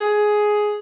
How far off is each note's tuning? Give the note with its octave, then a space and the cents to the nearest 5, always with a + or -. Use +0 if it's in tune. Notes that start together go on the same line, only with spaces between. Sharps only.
G#4 +10